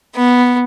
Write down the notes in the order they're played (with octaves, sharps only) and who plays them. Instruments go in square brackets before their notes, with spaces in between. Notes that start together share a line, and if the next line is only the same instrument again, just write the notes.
[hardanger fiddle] B3